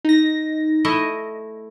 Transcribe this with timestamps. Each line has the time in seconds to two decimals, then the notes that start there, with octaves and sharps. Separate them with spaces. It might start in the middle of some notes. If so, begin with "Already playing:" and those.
0.05 D#4 A#6
0.85 A3 E4 D#5